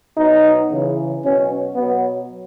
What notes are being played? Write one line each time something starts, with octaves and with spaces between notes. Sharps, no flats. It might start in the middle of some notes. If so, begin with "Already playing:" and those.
B2 F#3 D#4
C#3 E3
B2 F#3 C#4
B2 F#3 B3